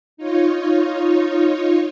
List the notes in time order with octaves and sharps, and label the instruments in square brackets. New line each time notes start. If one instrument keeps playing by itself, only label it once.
[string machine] D#4 F4 C#5